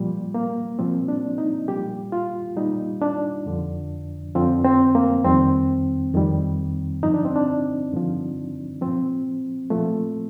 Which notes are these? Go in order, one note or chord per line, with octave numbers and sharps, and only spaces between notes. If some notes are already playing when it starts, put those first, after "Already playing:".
Already playing: A#2 F3 G3
A#3
A#2 F3 C4
D4
D#4
A#2 G3 G4
F4
A#2 G3 D#4
D4
F2 D3 F3
F2 D3 F3 C4
C4
A#3
F2 D#3 G3 C4
F2 D#3 G3
G2 D3 F3 D#4
D4
C4
D4
G2 D3 F3
A#2 F3 C4
A#2 F3 A3